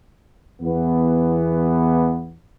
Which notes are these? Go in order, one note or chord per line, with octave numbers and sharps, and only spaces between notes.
E2 E3 B3